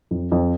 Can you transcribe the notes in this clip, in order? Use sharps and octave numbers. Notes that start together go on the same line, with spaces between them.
F2
F2